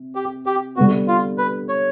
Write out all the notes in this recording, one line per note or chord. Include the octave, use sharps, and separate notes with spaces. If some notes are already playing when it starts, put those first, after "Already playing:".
Already playing: C3
G4
G4
D3 G3 B3 F#4
F4
B4
C#5